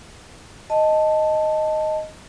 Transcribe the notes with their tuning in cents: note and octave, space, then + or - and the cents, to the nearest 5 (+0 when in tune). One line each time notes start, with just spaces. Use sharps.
D#5 +0 A5 +0